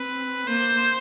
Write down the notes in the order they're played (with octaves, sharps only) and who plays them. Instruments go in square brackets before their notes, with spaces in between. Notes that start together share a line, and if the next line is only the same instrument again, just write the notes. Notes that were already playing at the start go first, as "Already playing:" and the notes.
Already playing: [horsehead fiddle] C4 [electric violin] B4
[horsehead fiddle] A#3 [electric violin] C5